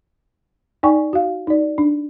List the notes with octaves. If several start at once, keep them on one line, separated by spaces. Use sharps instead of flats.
D#4 D5 G5 G#5 C#6
F#4 F5
D#4 D5
D4